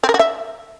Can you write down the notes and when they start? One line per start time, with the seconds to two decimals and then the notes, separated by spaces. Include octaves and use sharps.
0.04 C4
0.09 A#4
0.14 F#4
0.19 E5